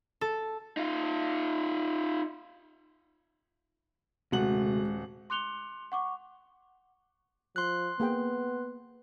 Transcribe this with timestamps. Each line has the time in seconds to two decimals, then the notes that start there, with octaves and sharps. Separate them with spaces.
0.21 A4
0.77 D#4 F4
4.32 D#1 C3 G#3 A3 F#4 F#5 F#7
5.30 C6 D6 F#6 C#7 F7 G7
5.92 F#5 C#6 D6
7.56 F3 C6 F#6
8.00 A#3 B3 G#4 G5